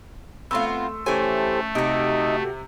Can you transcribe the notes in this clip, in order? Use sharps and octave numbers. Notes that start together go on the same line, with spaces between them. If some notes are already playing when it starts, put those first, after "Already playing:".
A3 B3 C4 F4 C6 E6
E3 A3 C#4 G4 A4 C5 G#5
C3 D#4 F#4 G4 D#5